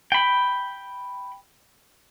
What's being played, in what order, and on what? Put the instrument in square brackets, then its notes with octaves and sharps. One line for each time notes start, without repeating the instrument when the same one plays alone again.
[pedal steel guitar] G5 B5